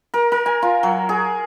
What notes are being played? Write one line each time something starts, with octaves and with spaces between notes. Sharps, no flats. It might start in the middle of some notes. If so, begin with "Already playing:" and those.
A#4
A#4
G#5
F4
F#3
G#4